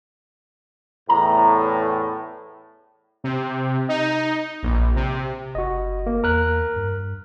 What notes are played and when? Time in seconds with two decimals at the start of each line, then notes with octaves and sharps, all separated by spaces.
1.09 E2 A2 A#5
3.24 C3
3.89 D#4
4.63 A#1
4.96 C3
5.55 F#1 F#4 D#5
6.06 A#3
6.24 E2 A#4 F#6
6.76 G2